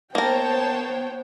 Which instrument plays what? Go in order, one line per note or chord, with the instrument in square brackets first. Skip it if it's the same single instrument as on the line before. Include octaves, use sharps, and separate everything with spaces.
[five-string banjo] A#3 A#4 [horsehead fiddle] B3 [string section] C5 C#5 G5 [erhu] A5